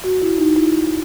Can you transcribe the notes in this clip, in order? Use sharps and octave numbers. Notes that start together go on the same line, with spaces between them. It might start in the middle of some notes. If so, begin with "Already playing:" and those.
F#4
E4
D#4
E4